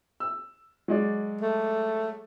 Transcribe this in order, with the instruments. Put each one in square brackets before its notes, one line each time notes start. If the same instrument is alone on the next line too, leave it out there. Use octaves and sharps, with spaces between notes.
[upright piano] E6
F#3 G#3 D5
[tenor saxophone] A3